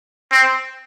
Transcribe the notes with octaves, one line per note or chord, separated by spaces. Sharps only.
C4